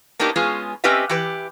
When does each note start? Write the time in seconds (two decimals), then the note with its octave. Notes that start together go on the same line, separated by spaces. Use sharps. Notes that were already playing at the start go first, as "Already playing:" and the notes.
0.19 A#3 B3 D4 D#4 G4 A#4
0.36 G#3 B3 C#4 F4 G#4
0.84 C4 C#4 G4 B4 D#5 E5
1.09 E3 G4 B4